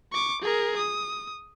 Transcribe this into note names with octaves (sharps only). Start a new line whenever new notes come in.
C#6 D6
G#4 A#4
D#6